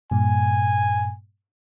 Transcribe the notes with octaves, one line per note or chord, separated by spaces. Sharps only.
G2 A#2 G#5